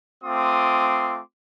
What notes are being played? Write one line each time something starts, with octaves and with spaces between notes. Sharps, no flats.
A3 C4 F4 C6 D6 D#6